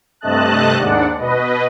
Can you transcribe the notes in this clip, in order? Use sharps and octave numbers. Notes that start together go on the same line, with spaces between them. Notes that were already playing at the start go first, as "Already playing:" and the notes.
G2 C3 A3 D#5 A5 F#6
D#2 G#2 D4 D5 F#5
B2 B4 D#5